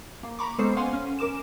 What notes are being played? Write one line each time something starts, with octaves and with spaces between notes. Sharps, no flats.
A#3
A#5 B5 C#6 D6
G#3 B3 C#4 A4 C5 C7
F5 F#5 G#5 C6
C#4
C#4 A#4 D6 E7